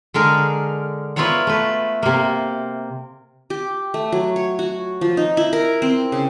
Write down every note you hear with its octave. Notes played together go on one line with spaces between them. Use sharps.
D3 G#3 A#4
B3 E4 F4 A#4 C#5 F#5
A3 B4
C3 A#3
G4
A3
F#3
C#5
F#4
F3
D#4
E4
A#4
C4
C#3